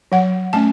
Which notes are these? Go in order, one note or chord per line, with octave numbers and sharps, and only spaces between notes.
F#3 F#5
A3 C#4 A5